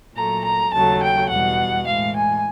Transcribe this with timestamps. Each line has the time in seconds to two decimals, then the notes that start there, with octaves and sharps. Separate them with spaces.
0.16 A#2 F#3 A3 A#5
0.45 A#5
0.73 D#2 C#3 F#3 A3 A5
1.02 G5
1.30 E2 B2 G3 F#5
1.86 A2 E3 G#3 F5
2.15 G#5